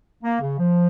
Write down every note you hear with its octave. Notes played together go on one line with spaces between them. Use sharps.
A#3
C#3
F3